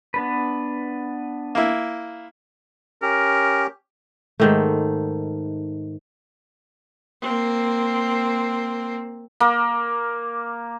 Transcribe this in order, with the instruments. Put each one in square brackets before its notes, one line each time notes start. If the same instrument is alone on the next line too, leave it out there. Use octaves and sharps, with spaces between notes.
[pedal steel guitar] B3 D4 B4
[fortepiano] A#3 E4
[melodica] C#4 G4 [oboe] A#4
[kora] G#2 D#3 A3
[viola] A#3 C4
[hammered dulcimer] A#3